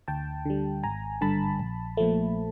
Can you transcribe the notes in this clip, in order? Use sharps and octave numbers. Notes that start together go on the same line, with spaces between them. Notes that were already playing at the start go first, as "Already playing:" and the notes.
D2 G5 A5
D3 G3
G#1 G#5 A#5
G2 D3 A5 B5
A#1
A#2 F3 A3